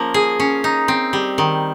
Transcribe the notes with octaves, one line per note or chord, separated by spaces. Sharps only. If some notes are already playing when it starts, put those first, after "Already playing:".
Already playing: F3 A#3 C#4
G#4
C#4
D#4
C4
G3
D#3